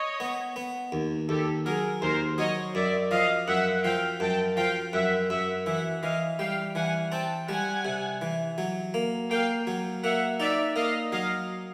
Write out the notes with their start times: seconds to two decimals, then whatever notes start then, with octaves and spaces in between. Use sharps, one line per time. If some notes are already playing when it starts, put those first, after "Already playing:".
Already playing: C#5 D#5
0.20 B3
0.56 B3
0.92 D#2
1.29 D#2 G4 A4
1.66 F#3 G#4 A#4
2.02 D#2 A#4 C5
2.38 F#3 C#5 D#5
2.75 F#2 D5 E5
3.11 F3 D#5 F5
3.47 F#2 E5 F#5
3.84 F3 F5 G5
4.20 F#2 G5 A5
4.56 F3 F5 G5
4.93 F#2 E5 F#5
5.29 F#2 E5 F#5
5.66 E3 E5 F#5
6.02 E3 D#5 F5
6.39 G3 F5 G5
6.75 E3 F#5 G#5
7.12 C4 G5 A5
7.48 G3 F#5 G#5
7.85 C3
8.22 E3
8.58 F#3
8.94 A#3
9.30 A#3 F5 G5
9.67 F#3
10.03 A#3 E5 F#5
10.40 D#4 D5 E5
10.76 A#3 D#5 F5
11.12 F#3 D#5 F5